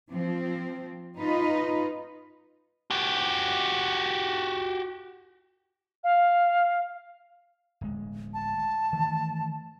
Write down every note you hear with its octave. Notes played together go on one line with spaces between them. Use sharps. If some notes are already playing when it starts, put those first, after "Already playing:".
F3 C4
D#4 F4 B4 D#5
F#4 G4
F5
D1 G#3
A5
D#3 E3 A3